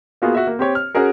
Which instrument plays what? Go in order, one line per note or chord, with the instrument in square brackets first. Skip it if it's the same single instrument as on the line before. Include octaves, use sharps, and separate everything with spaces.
[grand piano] A#3 B3 F4 F#4 G#4
F#4 E5
A#3
C4 G4 C#5
F6
C#4 F#4 G#4 A#4